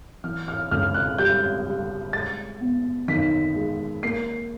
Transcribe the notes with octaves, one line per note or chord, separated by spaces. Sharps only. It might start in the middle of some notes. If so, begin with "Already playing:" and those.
E3 F6
F6
C#2 F6
F#6
G3 G6
G3
G#3 A6
B3
D#3 B6
G#3
A#3 C7